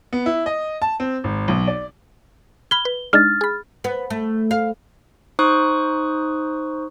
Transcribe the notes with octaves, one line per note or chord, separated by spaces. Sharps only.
B3
E4
D#5
A5
C4
G#1
B1
D5
B5 F6 G#6 G7
B4
G#3 D4 D#4 F6 A6
G#4 B5
B3
A3
F5
D#4 C5 C#6 D#6 F#6